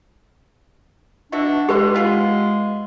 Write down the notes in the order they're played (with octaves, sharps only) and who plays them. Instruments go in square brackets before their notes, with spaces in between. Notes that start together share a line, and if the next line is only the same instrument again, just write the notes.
[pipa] B2 F#4 E5 [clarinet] D4
[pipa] D#3 E4 C6 [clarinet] G#3 [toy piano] G4 B4
[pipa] B3 F4 G#4